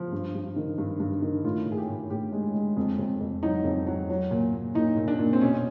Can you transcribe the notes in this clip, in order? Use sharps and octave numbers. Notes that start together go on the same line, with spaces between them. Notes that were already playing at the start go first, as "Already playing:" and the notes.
Already playing: F3
G2
G2
D#3
G2
G2
D#3
A2 F4
A2
G#4
G4
A2
A2 G4
G#3
G#3
F2
F2
F2
F#3 D#4
F2
F#3
F#3
A#2
A#2
A#2 D#4
A#2
D4
A#2
C4
B2 C#4